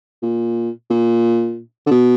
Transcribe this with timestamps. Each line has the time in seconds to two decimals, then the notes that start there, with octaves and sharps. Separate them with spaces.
0.22 A#2
0.90 A#2
1.86 D3
1.91 B2